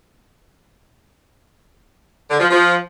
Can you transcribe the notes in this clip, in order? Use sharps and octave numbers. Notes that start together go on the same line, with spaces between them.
D3
F3
F3